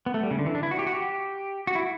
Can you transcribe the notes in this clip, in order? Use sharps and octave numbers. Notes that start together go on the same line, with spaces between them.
B3
A3
G3
C#3
D3
E3
D4
E4
F#4
G4
F#4
G4
F#4
E4